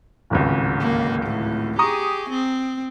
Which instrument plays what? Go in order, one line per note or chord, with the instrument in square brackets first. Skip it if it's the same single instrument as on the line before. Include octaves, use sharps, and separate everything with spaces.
[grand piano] D1 G#1 C#2
[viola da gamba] A#3
A2
[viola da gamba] G4 G#4 [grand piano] A#5 C#6 D#6
[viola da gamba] C4